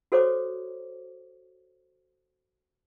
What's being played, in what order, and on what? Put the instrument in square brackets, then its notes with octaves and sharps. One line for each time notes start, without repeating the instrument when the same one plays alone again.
[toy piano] F#4 A4 C5 C#5 D6